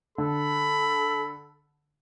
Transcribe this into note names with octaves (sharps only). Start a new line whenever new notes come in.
D3 A4 B5